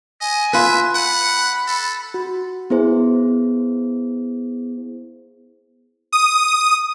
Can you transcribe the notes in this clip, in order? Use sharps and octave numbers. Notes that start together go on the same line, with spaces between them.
D#5 G#5
F4 B4 E5
F#5 B5
A4
F#4
B3 E4 G#4 C5
D#6